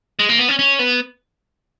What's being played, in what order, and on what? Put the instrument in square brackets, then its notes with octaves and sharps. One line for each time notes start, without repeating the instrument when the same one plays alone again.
[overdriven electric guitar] G#3
A#3
B3
C#4
C#4
B3